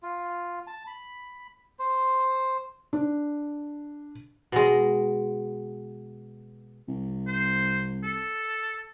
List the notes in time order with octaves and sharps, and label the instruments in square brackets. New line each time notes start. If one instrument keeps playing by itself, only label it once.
[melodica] F4
A5
B5
C5
[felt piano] D4
[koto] B2 G#3
[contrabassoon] C2
[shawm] C5
A4